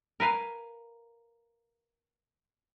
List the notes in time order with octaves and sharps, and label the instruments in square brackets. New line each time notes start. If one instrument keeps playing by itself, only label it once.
[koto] A#4 B4 F5 G#5